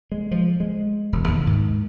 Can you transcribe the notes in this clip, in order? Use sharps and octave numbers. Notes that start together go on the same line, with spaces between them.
G#3
F3
G#3
E1
D#2
G#2